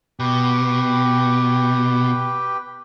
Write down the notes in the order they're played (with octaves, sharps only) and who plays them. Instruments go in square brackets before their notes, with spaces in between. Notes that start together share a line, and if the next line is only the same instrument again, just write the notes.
[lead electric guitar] B2 [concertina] G4 B4 G5